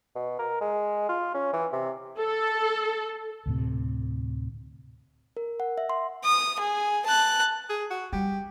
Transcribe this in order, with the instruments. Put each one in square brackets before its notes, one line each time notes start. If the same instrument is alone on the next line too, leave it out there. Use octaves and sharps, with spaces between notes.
[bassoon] B2
A#4
G#3
F4
C#4
E3
C3
[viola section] A4
[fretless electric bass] D2 A2 C3
[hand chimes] A#4
F#5
E5
C6
[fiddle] D#6
G#4
A5 F#6
[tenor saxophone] G#4
F#4
[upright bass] G3 [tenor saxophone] G4